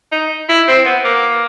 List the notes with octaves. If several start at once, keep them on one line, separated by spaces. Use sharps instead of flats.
D#4
E4
C4
B3
A#3